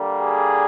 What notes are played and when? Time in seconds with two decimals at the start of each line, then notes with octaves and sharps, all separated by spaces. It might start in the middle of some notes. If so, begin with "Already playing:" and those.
Already playing: D3 G3 A#3
0.19 G#4